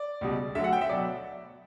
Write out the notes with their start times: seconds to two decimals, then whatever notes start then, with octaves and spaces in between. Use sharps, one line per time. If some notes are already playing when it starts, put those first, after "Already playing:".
Already playing: D5
0.21 C#2 B2 G3
0.55 D2 D3 F#3 E5
0.64 F#5
0.73 G5
0.81 E5
0.89 B2 F#3 D5